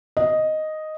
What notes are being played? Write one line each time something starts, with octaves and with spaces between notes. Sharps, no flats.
D#5